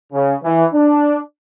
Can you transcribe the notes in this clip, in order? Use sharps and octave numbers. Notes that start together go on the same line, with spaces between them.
C#3
E3
D4